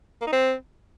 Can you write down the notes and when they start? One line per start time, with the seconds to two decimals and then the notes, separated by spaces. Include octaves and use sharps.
0.21 A#3
0.27 D#4
0.32 C4